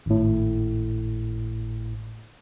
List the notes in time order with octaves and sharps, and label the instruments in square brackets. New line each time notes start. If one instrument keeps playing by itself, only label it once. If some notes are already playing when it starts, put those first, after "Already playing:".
[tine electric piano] G#1 A2